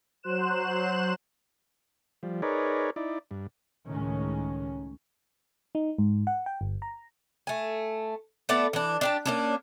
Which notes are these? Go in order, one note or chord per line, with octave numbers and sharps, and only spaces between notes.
F#3 C5 F#6 E7
F3 G3
D#4 G#4 A#4 B4 C#5 D5
D#4 E4 D5
G2
C#2 A2 D#3 G#3 C#4
D#4
G#2
F#5
G5
G1
A#5
A3 G#5
A3 B3 D5 A5
E3 D4
D4 G4 A5
A#3 C#4 D4